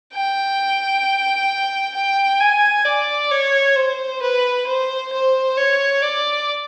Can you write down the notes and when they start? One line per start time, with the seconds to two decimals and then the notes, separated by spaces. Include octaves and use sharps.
0.14 G5
1.95 G5
2.40 G#5
2.85 D5
3.31 C#5
3.76 C5
4.22 B4
4.67 C5
5.12 C5
5.57 C#5
6.02 D5